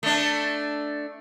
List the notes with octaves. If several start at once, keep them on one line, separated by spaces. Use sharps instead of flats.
A3 D4